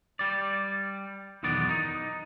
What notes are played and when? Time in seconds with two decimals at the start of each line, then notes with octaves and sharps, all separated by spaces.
0.19 G3 D5
1.43 B1 E2 D#3 B3 D5
1.69 D#4